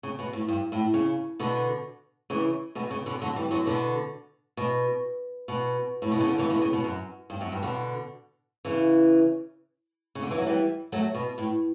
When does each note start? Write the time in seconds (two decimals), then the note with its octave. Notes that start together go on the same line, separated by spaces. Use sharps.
0.03 C#3
0.19 B2
0.33 A2
0.48 G2
0.72 A2
0.94 C#3
1.40 B2 D3
2.30 C#3 E3
2.75 B2 D3
2.91 C#3
3.06 B2 D3
3.22 D3 F#3
3.36 E3 G3
3.51 D3 F#3
3.66 B2 D3
4.57 B2
5.48 B2
6.02 A2
6.11 B2
6.20 C#3
6.29 D3
6.38 C#3 E3
6.50 B2 D3
6.62 C#3
6.73 B2
6.84 F#2
7.30 G2
7.41 F#2
7.52 G2
7.63 B2 D3
8.65 C#3 E3
10.15 C#3
10.23 D3
10.31 E3
10.38 F#3
10.46 E3 G3
10.92 F#3 A3
11.15 B2
11.38 A2